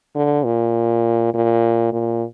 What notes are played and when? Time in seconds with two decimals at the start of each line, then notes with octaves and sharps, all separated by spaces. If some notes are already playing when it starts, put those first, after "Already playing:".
0.15 D3
0.45 A#2
1.34 A#2
1.93 A#2